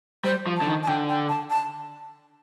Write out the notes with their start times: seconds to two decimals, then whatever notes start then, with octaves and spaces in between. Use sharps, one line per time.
0.24 G3 C5
0.47 F3
0.57 A5
0.61 D3
0.67 D#3
0.83 A5
0.88 D3 G5
1.09 G5
1.29 A5
1.50 A5